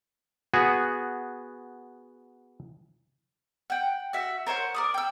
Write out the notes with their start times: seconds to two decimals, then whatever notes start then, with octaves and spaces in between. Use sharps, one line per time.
0.54 B3 F#4 G#4
3.70 F#5 G5
4.13 F#4 E5
4.47 A#4 C5 C#5 F#5
4.74 A#4 D5 D#6
4.94 G5 E6